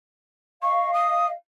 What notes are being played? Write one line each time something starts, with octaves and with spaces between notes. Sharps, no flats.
D#5 F5 C#6
D#6